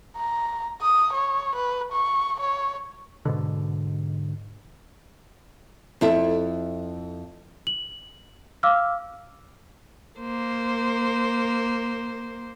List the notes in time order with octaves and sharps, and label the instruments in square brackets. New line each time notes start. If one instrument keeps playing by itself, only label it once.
[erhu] A#5
D#6
C#5
B4
C#6
C#5
[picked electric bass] G#2 B2 D3
[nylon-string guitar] F2 E4 A4
[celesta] F#7
F5 D6 E6 F6
[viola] A#3 C5